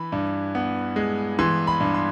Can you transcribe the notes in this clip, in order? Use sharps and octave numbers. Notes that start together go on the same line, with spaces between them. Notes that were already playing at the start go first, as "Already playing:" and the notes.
Already playing: E3 B5
G2
B3
G#3
E3 C6
B5
G2
C6